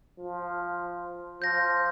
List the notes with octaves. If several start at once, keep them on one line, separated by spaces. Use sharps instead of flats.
F3
F3 G6 A#6